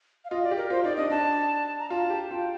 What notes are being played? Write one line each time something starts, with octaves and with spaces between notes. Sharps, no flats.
F5
F4 D#5
D5
G4
A#4
F4 C5
D#4 D5
D4 D#5
D4 A5
A#5
F4 A5
G4
F4 G5